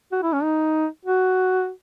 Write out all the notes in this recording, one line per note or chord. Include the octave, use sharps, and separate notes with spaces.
F#4
E4
C#4
D#4
F#4